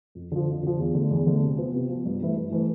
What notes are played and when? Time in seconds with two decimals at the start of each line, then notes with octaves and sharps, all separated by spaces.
0.15 F2
0.32 D3 F3
0.48 F2
0.63 D3 F3
0.78 E2
0.95 D3 A3
1.11 E2
1.27 D3 A3
1.42 C3
1.57 F3 B3
1.74 C3
1.89 F3 B3
2.05 G2
2.20 E3 A3 E4 B4
2.36 G2
2.52 E3 A3 E4 B4